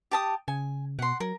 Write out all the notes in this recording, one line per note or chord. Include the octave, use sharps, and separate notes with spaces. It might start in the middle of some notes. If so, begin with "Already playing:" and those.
G4 A5 D#6
C#3 G#5
B2 F#5 C6
F#3 A#4